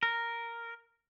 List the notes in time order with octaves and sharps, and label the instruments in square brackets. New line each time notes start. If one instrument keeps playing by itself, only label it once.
[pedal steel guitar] A#4